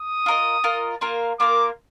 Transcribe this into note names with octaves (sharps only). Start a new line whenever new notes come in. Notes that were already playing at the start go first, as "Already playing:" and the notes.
Already playing: D#6
F4 A#4 D#5
F4 A#4 D#5
A#3 F4 A#4
A#3 F4 A#4 D6